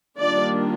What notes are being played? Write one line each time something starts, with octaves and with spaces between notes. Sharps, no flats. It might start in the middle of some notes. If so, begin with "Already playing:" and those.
D#3 G3 A#3 D4 F4 D5